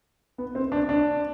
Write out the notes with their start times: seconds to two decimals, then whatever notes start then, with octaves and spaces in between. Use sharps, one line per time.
0.38 B3
0.55 C4
0.72 D4
0.89 D4